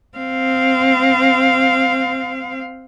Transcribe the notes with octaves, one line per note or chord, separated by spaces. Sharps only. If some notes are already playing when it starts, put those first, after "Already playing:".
C4 F5